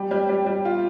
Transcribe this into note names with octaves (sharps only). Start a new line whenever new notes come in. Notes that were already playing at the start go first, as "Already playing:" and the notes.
Already playing: G3
G3
G3
G3
F4